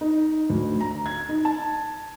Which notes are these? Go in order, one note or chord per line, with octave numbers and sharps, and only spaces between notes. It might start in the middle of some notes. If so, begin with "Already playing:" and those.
D#4
D2
A#5
G#6
D#4
A5